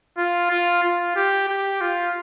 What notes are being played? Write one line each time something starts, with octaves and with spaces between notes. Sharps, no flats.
F4
F4
F4
G4
G4
F4